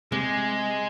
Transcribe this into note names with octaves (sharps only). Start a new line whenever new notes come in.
C3 G#3